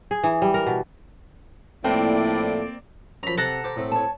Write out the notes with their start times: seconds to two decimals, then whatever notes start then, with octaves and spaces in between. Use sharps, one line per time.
0.11 G#4
0.24 E3
0.42 G3
0.54 A#4
0.67 B2
1.84 A2 F3 A#3 C4 E4 A4 D5
3.23 F#2 F3 A#5 B5
3.37 C3 A4 F#5 A#5
3.64 G4 C5 G5
3.76 A2 A3 C4
3.92 C#5 A5